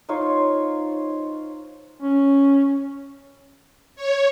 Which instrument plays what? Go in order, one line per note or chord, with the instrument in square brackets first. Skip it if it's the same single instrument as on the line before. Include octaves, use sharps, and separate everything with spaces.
[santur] D#4 F4 C5 C#5
[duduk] C#4
[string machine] C#5